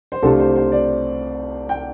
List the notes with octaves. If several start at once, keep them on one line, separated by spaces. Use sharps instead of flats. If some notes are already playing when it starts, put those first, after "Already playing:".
C5
C2 C3 A3 D4 F4 A4
C5
C5
D5
G5